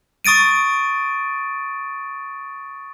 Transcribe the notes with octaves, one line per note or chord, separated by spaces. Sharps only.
C#6 D#6 A6 D7 D#7